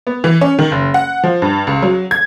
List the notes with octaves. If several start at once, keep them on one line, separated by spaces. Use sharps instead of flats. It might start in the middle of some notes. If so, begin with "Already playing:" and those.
B3
E3
C#4
D#3
F#1
F#5
F3
G2
C#2
F#3
G#6